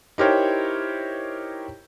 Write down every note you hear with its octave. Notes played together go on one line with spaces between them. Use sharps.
D#4 E4 G4 A#4 C5 C#5